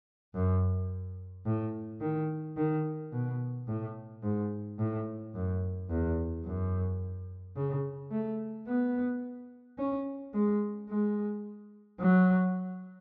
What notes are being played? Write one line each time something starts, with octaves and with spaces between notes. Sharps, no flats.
F#2
A2
D#3
D#3
B2
A2
G#2
A2
F#2
E2
F#2
C#3
A3
B3
C#4
G#3
G#3
F#3